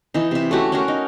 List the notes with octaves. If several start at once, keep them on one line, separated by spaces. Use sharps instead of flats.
E3 D#4
C3 E5
A3 C#4 F#4 G4
C#4 F#4 A#4
D#4